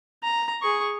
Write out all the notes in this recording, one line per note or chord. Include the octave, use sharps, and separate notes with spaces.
A#5
G#4 C#6